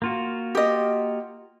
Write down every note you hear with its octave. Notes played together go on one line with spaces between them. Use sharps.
A#3 F4 F#4
G4 D#5